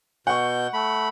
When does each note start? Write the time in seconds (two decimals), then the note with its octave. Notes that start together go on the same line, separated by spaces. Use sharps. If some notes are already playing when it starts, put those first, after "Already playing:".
0.27 B2 F#5 C#6 G6
0.73 A3 B5